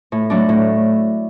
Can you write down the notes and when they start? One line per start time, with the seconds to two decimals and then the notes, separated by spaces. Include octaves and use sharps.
0.12 A2
0.30 F#3 A3 D4
0.49 A2